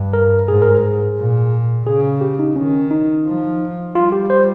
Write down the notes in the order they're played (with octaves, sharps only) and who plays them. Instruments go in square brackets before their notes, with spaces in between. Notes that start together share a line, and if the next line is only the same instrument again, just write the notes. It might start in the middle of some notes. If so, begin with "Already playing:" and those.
Already playing: [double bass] G2
[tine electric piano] A#4
[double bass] G#2 [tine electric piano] G#4
[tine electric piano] A#4
G#4
[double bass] A#2
[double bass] C#3 [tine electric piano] G#4
[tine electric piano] G4
D#4
[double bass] D#3 [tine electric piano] C#4
[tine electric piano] D#4
[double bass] F3
[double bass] G3 [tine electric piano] F4
[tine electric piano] G4
C5